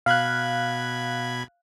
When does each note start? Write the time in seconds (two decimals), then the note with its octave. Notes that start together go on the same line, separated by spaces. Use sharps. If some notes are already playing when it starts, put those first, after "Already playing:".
0.06 B2 F5 B5 F#6 G#6